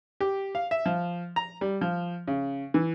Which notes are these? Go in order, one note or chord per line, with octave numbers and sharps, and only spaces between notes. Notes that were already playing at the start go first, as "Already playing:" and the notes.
G4
F5
E5
F3
A#5
G3
F3
C#3
E3